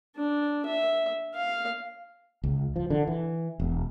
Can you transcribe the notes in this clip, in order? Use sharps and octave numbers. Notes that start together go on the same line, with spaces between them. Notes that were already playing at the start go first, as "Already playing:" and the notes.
D4
E5
F5
C#2
F3
D3
E3
E1